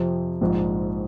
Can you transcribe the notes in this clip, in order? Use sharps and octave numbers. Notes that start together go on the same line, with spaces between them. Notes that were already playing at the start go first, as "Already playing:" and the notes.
Already playing: F2 C3 F3
A#1 G#2 F3